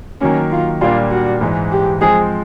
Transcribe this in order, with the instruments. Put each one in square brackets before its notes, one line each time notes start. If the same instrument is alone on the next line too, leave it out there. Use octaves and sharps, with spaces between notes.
[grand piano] D#3 F#3 A#3 [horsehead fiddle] C#4
[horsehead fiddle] F4
[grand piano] A#2 G3 A#3 D4 [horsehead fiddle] F4
[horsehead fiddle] F#4
[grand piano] G#2 E3 G#3
[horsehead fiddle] G4
[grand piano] F3 G#3 C4 [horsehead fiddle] G#4